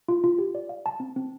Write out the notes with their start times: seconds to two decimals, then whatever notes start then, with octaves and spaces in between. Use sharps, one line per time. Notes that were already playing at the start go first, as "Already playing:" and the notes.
0.09 F4
0.24 F4
0.38 G4
0.55 D5
0.69 F5
0.86 A5
1.00 C4
1.16 C4